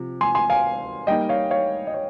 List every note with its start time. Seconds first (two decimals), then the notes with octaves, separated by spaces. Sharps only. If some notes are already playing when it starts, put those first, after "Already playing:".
Already playing: C3 F3
0.21 G#5 C6
0.35 G#5 C6
0.50 F5 G#5
1.07 G3 A#3 D#4 D#5 G5
1.29 C#5 F5
1.51 C#5 F5
1.87 D#5
1.94 C#5